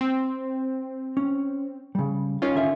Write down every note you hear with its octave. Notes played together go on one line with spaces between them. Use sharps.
C4
C#4
C#3 G3
D#3 C#4 F4 F5
D3 E5